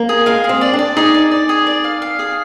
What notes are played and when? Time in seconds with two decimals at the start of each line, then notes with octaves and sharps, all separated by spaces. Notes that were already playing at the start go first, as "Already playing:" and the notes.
Already playing: A#3
0.09 G#4
0.26 G#3 F5
0.44 G#4
0.49 C4
0.61 D5
0.73 D4
0.79 D5
0.97 D#4 G#4
1.14 D5
1.31 D5
1.49 G#4
1.67 D5
1.84 F5
2.02 F5
2.19 G#4